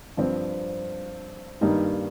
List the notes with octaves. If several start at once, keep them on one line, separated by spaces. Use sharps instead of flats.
G2 F3 C4
G2 D#3 G3 A#3 D#4